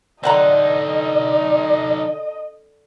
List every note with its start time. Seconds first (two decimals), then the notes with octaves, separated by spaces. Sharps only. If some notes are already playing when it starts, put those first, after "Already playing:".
0.23 D3 C4 D#4 A4 D#5 F#5 A#5